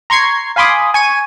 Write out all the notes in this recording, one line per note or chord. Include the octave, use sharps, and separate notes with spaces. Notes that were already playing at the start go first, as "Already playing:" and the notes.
A#5 C6 C#6 G#6 C7
F5 G#5 B5 C6 D6 D#6
G#5 C#6 D#7